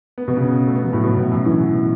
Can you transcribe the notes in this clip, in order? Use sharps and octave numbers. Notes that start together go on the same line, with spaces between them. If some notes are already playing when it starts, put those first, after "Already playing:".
B3
B2
C#3
A3
B3
F#3
A2
B2
A2
F#2
E3
B2